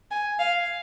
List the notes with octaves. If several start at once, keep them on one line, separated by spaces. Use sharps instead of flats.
G#5
F5